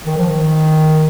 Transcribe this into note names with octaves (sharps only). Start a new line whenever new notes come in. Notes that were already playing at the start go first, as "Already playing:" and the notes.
D#3
F3
D#3